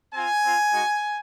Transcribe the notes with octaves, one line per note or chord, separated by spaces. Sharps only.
C4 F4 G#5
C4 F4
G#3 D#4 F#4